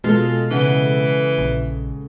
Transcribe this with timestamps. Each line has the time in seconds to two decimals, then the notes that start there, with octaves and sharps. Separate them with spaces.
0.04 B2 G#3 F4 A4
0.51 C#3 E3 F#5
1.38 A#1